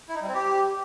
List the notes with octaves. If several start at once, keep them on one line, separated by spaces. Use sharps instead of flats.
E4
D#4
G3
C4
G4